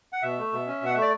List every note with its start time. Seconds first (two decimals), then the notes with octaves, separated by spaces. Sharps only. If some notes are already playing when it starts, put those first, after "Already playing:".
0.13 F#5
0.22 B2 E5
0.38 A3
0.53 B2
0.67 C#4
0.81 B2 F#5
0.94 A3 E5
1.02 D5